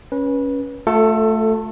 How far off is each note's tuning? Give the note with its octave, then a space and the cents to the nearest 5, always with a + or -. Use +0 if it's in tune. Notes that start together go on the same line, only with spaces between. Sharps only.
C#4 +0 B4 -25
A3 +0 F4 +35 A4 +15